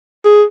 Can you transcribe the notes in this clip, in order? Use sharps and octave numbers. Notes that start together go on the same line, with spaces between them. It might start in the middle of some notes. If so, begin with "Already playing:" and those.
G#4